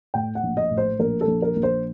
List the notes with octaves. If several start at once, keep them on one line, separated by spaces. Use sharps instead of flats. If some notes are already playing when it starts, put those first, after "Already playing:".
A2 G5
F#5
A#1
D#5
A2
C5
A#1 A#4
A4
A#1
A#4
A#1
C5